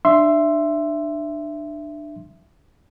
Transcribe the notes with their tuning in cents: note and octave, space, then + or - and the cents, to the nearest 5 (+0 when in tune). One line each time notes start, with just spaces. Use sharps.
D4 +25 E5 +15 C6 +0